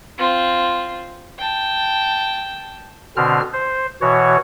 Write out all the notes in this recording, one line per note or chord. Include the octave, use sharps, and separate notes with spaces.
C4 F4
G5 A5
B2 D3 C4 F6
C5
B2 E3 F#4 C#5